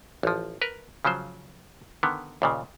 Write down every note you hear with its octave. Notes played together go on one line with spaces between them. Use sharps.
A1 F3
A#4 B4
C#3 F3 F#3 C5
D3 D#3 B3
D#2 A#2 C#3